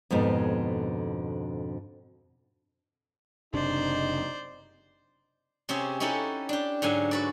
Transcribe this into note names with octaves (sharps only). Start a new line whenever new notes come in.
F2 G#2 B2 D3
F#1 C3 D4 D#4 C5 D5
C3 C#4 G4 G#4
C#4 D#4 E4 G4 A4 F#5
D4 G4
G#2 D3 F#3 G#5
F#4 B4 D5